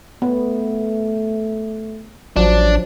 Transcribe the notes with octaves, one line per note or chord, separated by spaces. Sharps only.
A3 B3
A1 F3 F#3 D4